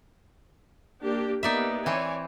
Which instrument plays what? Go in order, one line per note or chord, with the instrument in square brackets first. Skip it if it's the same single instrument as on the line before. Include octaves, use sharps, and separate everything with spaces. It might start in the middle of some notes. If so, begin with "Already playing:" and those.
[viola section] A#3 D4 G4
[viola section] A#3 B3 G4 [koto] D#4 D5 E5
[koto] E3 C4 [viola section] C#5 D5 G#5